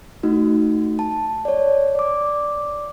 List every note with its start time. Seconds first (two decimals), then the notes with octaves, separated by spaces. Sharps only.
0.23 A3 D#4 F#4
0.99 A5
1.45 C#5 D5
1.95 D5 D6